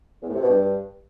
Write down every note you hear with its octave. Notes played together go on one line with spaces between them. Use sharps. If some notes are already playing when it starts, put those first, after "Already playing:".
E2
A2
C3
B2
G2